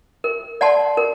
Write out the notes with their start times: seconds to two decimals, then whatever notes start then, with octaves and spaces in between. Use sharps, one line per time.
0.24 A#4
0.61 D5 F#5 A5 C6
0.97 A#4